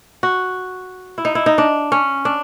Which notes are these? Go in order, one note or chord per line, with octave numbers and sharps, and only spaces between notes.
F#4
E4
D#4
E4
D#4
D4
C#4
D4